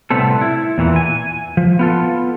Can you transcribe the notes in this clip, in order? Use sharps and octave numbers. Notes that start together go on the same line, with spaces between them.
A2 C3 G3 B3 C4 A4
E4
E2 A#2 E3
G#5
F3
B3 F4 A4